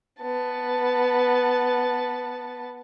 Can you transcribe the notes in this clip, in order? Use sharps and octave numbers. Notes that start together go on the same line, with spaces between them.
B3 A5